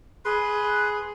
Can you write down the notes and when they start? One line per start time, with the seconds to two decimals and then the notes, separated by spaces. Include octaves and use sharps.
0.25 G#4 B4 C6